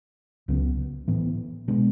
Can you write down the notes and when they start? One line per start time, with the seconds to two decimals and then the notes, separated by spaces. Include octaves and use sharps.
0.48 C#2 C#3 F#3 B3
1.08 A2 E3 B3
1.68 B2 G#3 B3 D4